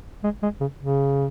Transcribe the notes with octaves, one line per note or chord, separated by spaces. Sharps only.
G#3
G#3
C#3
C#3